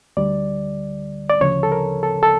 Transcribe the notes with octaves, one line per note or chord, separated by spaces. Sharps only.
D2 D3 G3 D5
D5
D2 C#3 F3 C#5
A4
A#4
A4
A4